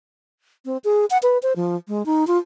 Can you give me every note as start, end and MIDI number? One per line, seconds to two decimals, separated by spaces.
0.65 0.78 60
0.84 1.05 68
1.10 1.18 78
1.23 1.38 71
1.43 1.53 72
1.56 1.76 53
1.88 2.05 56
2.06 2.27 63
2.27 2.38 65